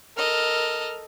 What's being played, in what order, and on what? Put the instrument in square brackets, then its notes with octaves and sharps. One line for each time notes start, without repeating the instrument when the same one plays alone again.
[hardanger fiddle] A4 D#5 [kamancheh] A#4 F6